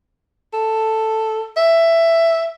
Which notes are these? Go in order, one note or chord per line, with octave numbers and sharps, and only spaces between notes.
A4
E5